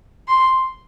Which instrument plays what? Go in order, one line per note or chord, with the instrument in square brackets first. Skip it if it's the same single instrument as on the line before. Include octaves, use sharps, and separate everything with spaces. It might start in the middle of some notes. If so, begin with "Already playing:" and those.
[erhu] C6